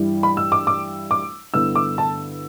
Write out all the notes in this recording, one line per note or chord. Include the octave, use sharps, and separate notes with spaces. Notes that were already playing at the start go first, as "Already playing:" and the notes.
Already playing: G2 E3 G3 E4
B5
E6
D6
D6
D6
G2 D3 B3 E4 E6
D6
A5